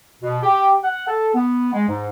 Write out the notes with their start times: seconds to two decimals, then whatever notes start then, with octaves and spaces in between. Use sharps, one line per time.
0.22 B2
0.43 G4
0.83 F#5
1.08 A4
1.35 B3
1.73 G#3
1.88 G#2